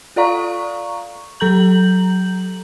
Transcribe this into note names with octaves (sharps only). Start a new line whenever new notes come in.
F4 A4 D5 F5 A#5 C#6
F#3 A4 A#5 G6 F#7